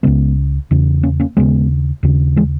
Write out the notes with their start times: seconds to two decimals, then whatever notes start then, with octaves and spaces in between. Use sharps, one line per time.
0.03 C#2 C#3 G#3 B3
0.71 E2 C#3
1.03 A#3 C#4
1.20 A#3 C#4
1.37 D#2 C#3 G#3 B3
2.03 D#2 C#3
2.36 E3 G#3